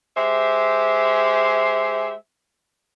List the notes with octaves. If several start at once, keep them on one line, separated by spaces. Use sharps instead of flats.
G#3 G4 C5 E5